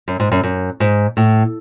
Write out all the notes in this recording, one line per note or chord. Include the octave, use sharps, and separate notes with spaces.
F#2
G#2
F#2
F#2
G#2
A2